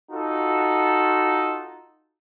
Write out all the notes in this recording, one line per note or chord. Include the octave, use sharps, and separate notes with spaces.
D#4 F4 F#4 A4